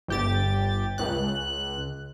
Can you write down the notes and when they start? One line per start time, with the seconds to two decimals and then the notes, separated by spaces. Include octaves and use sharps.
0.08 G1 G4 A6
0.98 C#2 F#6